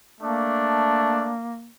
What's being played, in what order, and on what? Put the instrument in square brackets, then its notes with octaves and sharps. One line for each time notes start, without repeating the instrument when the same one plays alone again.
[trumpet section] A3 D4 [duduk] A#3